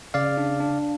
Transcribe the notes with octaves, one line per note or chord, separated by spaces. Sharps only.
C#3 D5 F5
D4
D4